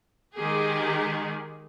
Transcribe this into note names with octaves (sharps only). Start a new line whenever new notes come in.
D#3 G#3 G4 G#4